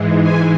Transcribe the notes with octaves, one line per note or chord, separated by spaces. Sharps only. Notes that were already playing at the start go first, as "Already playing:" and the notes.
Already playing: G#2 E3 G#3
G#5